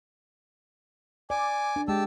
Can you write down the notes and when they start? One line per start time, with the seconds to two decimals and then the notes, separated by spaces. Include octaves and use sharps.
1.30 D5 G#5 D6
1.76 D4
1.88 G#3 G4 A5 E6